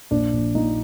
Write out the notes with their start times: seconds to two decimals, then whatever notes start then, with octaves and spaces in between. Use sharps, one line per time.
0.11 A#1 D4
0.33 A#1
0.55 A#2 D#4